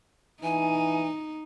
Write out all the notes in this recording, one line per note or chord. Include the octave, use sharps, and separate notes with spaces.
E3 D#4 G#5